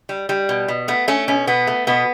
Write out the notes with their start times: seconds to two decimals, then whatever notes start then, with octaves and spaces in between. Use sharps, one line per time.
0.09 G3
0.29 G3
0.49 B2
0.68 B2
0.88 A3 B3
1.08 A3 C#4
1.28 B2 C#4
1.47 B2 B3
1.67 A3
1.87 B2 B3